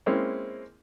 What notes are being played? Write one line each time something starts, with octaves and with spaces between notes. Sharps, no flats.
G#3 A#3 C4 C#4 E4